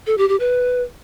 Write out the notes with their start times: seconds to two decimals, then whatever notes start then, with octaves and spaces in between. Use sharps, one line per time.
0.07 A4
0.18 G4
0.29 G4
0.40 B4